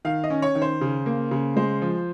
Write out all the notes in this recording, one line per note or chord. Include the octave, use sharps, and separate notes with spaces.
D#3 F5
D#5
C#4
C#5
D#3
C5
C#3
A#3
C#3
G#3 C5
F3